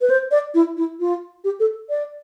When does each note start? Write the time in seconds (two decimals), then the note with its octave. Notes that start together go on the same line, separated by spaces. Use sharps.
0.01 B4
0.10 C5
0.31 D5
0.55 E4
0.77 E4
1.00 F4
1.44 G4
1.60 A4
1.90 D5